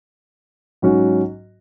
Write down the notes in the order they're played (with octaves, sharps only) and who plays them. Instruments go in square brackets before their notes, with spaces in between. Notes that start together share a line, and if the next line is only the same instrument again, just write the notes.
[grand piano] G#2 F#3 C#4 F#4